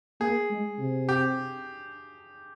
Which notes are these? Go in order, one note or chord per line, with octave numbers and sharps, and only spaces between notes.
A#3 G#4
G#3
C3
G4